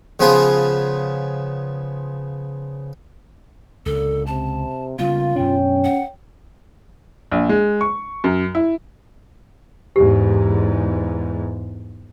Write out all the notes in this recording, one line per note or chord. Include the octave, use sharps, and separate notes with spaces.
C#3 F3 B3 F4 G#4
C#2 A#2 D3 A4
C3 A5
C#2 C#3 G3 A#3 B3 F4 F5
F#2 B2 C#4 D4 C#5 G5
F#5
A#1
G#3
C#6
F#2
E4
E2 G#2 G4